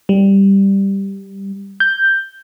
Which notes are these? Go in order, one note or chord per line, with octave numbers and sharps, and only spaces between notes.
G3
G6